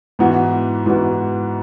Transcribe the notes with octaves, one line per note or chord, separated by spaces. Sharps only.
G#2 E3 B3 F#4
G#2 E3 B3 F#4